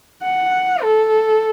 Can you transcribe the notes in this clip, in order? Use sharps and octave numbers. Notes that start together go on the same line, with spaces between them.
F#5
A4